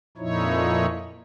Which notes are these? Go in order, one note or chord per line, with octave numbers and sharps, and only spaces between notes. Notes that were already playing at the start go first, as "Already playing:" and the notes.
F2 A#2 F3 D#4 E4 C#5